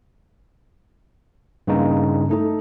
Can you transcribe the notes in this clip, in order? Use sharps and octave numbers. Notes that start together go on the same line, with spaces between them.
G2 C#3 A#3 D#4
A3 D#4 A4